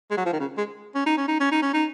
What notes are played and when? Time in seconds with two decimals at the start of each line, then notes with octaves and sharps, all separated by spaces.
0.11 G#3
0.17 F#3
0.25 F3
0.33 D#3
0.40 C#3
0.58 G#3
0.95 C#4
1.06 D#4
1.17 C#4
1.28 D#4
1.40 C#4
1.52 D#4
1.62 C#4
1.74 D#4